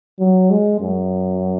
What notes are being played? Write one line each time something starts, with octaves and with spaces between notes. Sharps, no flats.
F#3
G#3
F#2